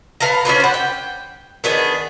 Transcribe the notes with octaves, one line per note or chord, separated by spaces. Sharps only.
B3 F5 A5 A#5
C#4 D4 F4 B4
C5 F#5
G5
D#3 B3 D4 G#4